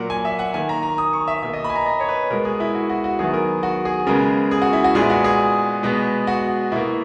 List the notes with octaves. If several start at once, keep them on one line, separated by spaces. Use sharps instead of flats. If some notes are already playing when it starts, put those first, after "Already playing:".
Already playing: A#2 F#3 A#3 F#5
G#5
E5
F#5
D#3 A#3 G#5
A#5
A#5
D#6
C#6
E5
B2 A#3 E5
D#5
B5
G#5
A#5
D#5
C#5
B4
B2 G#3 B3 A#4
G#4
E4
F#4
F#4
F#4
D#3 F#3 B3 G#4
A#4
F#4
G#4
C#3 G#3 B3 A#4
G#4
F#4
E4
F#4
A#2 G#3 B3 G#4
F#4
G#4
B2 G#3 B3
F#4
B2 A#3 E4